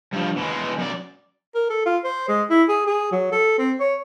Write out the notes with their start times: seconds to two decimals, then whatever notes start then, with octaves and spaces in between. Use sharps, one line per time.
0.13 G2 F3
0.38 B2 G#3
0.79 F#2 D5
1.55 A#4
1.70 A4
1.86 F4
2.04 C5
2.28 G#3
2.50 E4
2.69 G#4
2.87 G#4
3.12 F#3
3.32 A4
3.58 C4
3.80 C#5